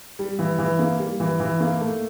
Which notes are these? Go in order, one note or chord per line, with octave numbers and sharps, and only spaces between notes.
G3
E3
E3
A#3
G3
E3
E3
A#3
A3